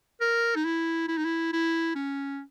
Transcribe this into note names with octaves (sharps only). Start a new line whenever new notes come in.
A#4
D#4
E4
E4
D#4
E4
E4
C#4